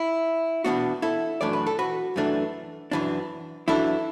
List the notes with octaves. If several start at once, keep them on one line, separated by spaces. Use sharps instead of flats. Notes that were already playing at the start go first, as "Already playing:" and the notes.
Already playing: E4
E2 B2 B3 D4 F#4
E4 A4
F#2 E3 A3 D4 D5
B4
A4
F#4 B4
F#2 E3 A3 D4
F#2 E3 D4
F#2 E3 D4 E4 A4